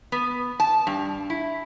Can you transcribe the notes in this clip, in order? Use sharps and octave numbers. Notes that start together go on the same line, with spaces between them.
B3
A5
G2
E4